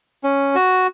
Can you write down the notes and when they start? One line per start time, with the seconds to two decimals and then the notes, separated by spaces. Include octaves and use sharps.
0.24 C#4
0.55 F#4